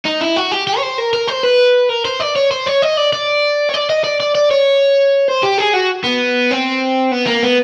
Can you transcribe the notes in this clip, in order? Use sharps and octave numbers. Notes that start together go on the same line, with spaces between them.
D#4
E4
F#4
G4
G4
C#5
C5
A#4
A#4
C5
B4
A#4
C5
D5
C#5
C5
C#5
D#5
D5
D5
C#5
D5
D#5
D5
D5
D5
C#5
C5
G4
G#4
F#4
B3
C4
B3
A#3
B3